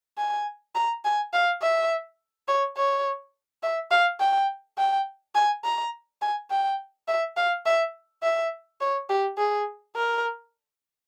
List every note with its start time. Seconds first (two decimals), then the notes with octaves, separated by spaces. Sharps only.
0.18 G#5
0.75 A#5
1.05 G#5
1.33 F5
1.62 E5
2.48 C#5
2.77 C#5
3.63 E5
3.91 F5
4.20 G5
4.78 G5
5.35 G#5
5.64 A#5
6.22 G#5
6.51 G5
7.08 E5
7.37 F5
7.66 E5
8.23 E5
8.81 C#5
9.09 G4
9.38 G#4
9.96 A#4